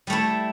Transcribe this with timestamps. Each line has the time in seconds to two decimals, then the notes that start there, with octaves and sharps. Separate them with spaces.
0.07 G3
0.10 A3
0.12 E4